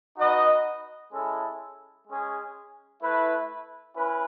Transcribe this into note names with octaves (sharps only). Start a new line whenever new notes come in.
D#4 F#4 B4 D#5
G#3 C#4 E4 A4
G#3 C#4 G#4
A3 E4 B4
C#4 E4 B4